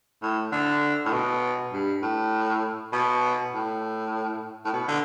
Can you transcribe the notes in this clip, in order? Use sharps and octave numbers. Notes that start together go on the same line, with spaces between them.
A2
D3
A2
B2
G2
A2
B2
A2
A2
B2
D3